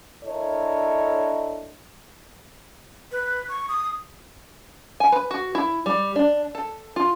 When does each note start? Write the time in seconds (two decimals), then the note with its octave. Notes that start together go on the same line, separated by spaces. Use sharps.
0.24 D4 E4 A4 A#4 C#5 D#5
3.12 B4
3.49 C#6
3.69 D#6
5.00 G#5
5.12 B4
5.31 F#4
5.55 E4
5.86 G3
6.16 D4
6.55 A4
6.96 F4